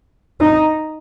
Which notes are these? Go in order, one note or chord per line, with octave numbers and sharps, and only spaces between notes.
D#4